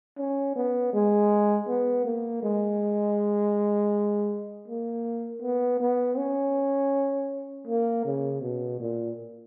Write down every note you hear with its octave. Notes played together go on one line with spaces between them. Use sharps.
C#4
B3
G#3
B3
A#3
G#3
A#3
B3
B3
C#4
A#3
C#3
B2
A#2